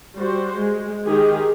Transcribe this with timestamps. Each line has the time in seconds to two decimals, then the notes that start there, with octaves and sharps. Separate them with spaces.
0.16 G3 F#4 C5
0.56 G#3
1.04 D#3 G#3 D#4 G4 G#4